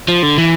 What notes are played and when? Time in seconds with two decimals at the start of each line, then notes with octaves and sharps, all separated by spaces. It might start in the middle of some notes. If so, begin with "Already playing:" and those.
0.08 F3
0.23 D3
0.38 E3